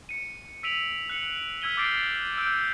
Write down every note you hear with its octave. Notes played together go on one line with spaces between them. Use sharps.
C#7 D#7
E6 B6 D7 D#7 F7 F#7
F#6 C#7 F#7
E6 F6 G#6 B6 D#7 G7
D6 F6 G6 A6 C7 D7
E6 F6 G6 D7